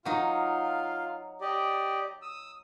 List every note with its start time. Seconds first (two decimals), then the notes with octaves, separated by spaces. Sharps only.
0.05 F#3 D#4 F4 F5
1.41 G4 D5 D#5
2.22 D#6 E6